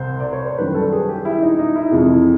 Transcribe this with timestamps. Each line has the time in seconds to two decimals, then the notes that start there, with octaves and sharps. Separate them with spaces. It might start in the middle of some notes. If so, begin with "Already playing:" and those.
Already playing: C2 C3 C5
0.20 D5
0.33 C#5
0.46 C5
0.58 F#2 D#3 G3 B4
0.74 A4
0.92 G#4
1.09 G4
1.25 E4
1.42 D#4
1.58 D#4
1.76 E4
1.91 F2 C3 E3 G#3